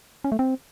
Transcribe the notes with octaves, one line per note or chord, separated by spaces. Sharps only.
C#4
A3
C4